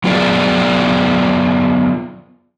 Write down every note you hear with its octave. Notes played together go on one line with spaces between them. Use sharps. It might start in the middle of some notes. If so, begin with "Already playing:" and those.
F#3 B3 F4 G#4 A#4 D5